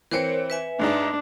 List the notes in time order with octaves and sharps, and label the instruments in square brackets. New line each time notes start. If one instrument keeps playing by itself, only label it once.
[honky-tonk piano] E3 C4 C#7 [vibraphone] A#4 C5 C#5
[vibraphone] B4 E5 G#5
[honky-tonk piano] G#2 G#3 D#4 [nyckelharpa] D4